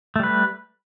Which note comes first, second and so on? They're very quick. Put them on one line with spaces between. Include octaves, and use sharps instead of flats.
A3 G3 B4